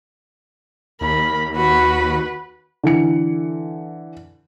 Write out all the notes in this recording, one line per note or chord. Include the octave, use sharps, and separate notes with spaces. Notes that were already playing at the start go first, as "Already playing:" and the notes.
D#2 A#4 B5
F#4 B4 B5
D3 E3 C#7